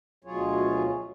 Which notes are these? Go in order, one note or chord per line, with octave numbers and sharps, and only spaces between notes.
D2 B2 F#3 F4 G#4 C#5